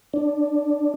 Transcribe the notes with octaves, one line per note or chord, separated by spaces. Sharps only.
D4 D5